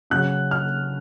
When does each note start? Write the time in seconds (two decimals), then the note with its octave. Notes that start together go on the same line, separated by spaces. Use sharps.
0.10 C#3 F#3 C#4 F#6
0.51 F6